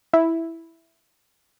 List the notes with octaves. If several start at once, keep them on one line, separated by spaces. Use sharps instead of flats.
E4